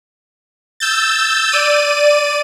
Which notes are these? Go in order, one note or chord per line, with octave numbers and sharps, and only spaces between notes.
E6 G6 A6
D5 D#7